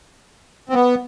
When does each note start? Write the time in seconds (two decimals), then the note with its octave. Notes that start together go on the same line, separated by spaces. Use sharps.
0.69 C4
0.74 B3